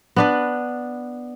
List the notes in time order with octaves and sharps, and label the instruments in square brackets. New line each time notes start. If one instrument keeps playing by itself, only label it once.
[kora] B3 D4 B4